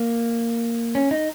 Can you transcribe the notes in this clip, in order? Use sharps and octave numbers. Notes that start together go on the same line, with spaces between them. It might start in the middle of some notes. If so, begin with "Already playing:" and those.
Already playing: A#3
C#4
D#4